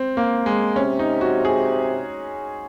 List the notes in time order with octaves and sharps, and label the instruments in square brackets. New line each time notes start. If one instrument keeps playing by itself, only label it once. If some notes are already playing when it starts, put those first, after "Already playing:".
Already playing: [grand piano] C4
A#3
G#3
[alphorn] C3 [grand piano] C#4
[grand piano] D#4
F#4
G#4